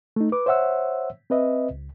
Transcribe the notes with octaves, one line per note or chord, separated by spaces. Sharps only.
A3 D#4
B4 D6
C5 C#5 E5 F#5 E6
C4 B4 D#5 E5
C#2